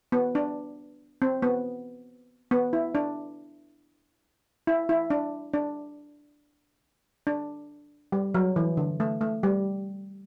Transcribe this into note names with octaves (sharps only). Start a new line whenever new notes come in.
B3
D4
C4
B3
B3
E4
D4
E4
E4
D4
D4
D4
G3
F#3
E3
D3
A3
A3
G3